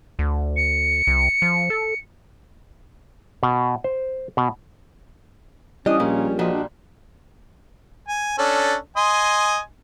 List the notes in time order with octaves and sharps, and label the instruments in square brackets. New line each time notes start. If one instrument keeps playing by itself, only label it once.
[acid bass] D2
[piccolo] C#7
[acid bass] C2
F3
A4
[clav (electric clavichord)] B2
C5
B2
[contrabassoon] E3 [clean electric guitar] G3 [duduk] C#4 [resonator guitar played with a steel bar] D4 D#5
[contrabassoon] A#1 [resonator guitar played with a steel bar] A#2
[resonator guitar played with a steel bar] A#2 G3 [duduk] F3 [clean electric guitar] F#4 D#5
[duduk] D4
[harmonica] G#5
C#4 D4 A4
D#5 G#5 C6